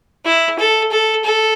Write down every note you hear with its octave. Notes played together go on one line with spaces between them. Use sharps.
E4
A4
A4
A4